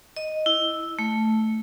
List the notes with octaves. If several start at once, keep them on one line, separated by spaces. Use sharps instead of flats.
D#5
E4
A3